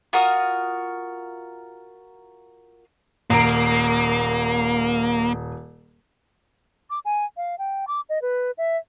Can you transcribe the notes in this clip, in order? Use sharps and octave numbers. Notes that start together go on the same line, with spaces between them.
F4 F#4 A#4 D#6
D#1 A#3 A#5 D7
D6
G#5
F5
G5
D6
D#5
B4
E5